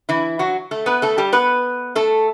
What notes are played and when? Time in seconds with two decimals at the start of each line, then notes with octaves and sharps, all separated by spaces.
0.09 E3 E4
0.39 F#3 F#4
0.71 A3 A4
0.86 B3 B4
1.02 A3 A4
1.18 G3 G4
1.33 B3 B4
1.95 A3 A4